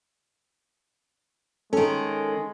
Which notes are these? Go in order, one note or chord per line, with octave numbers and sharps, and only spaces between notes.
D#3 G#3 C#4 A4